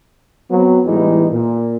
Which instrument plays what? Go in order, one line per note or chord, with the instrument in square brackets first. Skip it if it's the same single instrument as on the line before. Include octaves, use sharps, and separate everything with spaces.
[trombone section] F#3 B3 C4
E2 A2 E3 G3 G#3 D#4
A#2